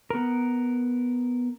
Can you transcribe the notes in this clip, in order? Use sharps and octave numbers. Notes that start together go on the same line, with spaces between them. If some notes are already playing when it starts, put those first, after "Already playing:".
B3 A#4